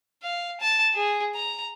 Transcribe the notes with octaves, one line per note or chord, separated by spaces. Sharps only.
F5
A5
G#4
A#5